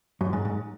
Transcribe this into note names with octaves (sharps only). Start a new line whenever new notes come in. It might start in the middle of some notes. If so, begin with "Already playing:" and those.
F#2
G#2
G#2